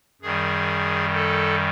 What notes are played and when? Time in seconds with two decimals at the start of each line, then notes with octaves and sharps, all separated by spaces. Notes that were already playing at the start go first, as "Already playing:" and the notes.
0.21 F#2 D#3 G3 G#4
1.14 A4